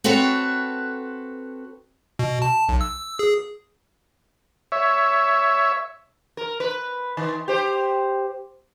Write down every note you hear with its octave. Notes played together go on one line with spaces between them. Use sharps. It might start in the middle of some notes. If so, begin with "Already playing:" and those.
C4 F#4 A4 B4 C#5
B2
A5
B1
E6
G#4
C#5 E5
A#4
B4
D#3
G4 C5